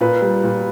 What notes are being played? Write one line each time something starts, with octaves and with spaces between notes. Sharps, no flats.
A#2 B4
G3
A#2